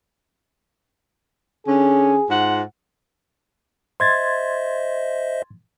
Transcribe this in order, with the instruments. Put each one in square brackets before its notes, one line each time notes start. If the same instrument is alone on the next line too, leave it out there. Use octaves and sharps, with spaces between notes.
[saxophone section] D3 C#4 [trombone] G#4
[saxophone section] G#2 F4 F#5
[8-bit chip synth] C5 D#5 E5 [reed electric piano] C6 G#6 A6